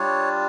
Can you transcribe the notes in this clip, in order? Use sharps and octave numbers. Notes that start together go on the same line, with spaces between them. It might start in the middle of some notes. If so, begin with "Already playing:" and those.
Already playing: G3 D4 F4 C#5